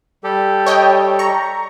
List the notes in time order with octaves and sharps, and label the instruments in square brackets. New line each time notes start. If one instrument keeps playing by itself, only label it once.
[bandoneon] G3 G4 A4
[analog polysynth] C#5 D#5 G5
A#5 C#6